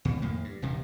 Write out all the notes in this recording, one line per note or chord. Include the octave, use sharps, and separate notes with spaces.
C#2 B2
F2 A2 D#3 A#3
G2
D#1 G2 C3